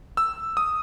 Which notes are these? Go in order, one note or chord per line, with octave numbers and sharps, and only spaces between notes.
E6
D#6